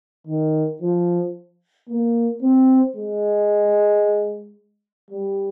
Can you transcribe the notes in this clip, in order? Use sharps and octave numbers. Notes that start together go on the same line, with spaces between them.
D#3
F3
A#3
C4
G#3
G3